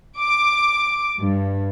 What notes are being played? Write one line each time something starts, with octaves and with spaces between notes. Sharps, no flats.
D6
G2